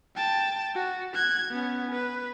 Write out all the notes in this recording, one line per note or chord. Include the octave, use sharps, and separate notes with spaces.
G5 A5
F#4
F#6 G#6
B3 C#4
B4